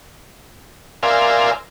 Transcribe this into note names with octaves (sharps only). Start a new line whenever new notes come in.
A#4 C5 D5 E5 F5 G#5